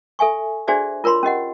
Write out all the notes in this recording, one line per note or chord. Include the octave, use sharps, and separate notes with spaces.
A4 E5 G#5 C#6
D4 F#4 G#4 C5 D5 E5
F4 A#4 C#5 B5 C6
C#4 G4 D#5 F#5